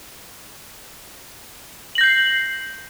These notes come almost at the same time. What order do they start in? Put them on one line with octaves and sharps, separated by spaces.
F#7 A#6 G6 C7